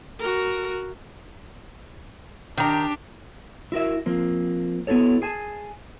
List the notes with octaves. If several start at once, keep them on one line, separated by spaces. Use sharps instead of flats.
F#4 A#4
D#3 D4 G4 A#5
E4 F#4 A#4 E5
F3 A#3 C4
B3 E4 F#4 A4 C#5
G#4 G#5 A5